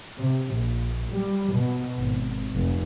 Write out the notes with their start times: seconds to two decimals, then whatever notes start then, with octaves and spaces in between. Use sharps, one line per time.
0.18 C3
0.53 A#1
1.10 G3
1.52 B2
1.98 G#1
2.52 F1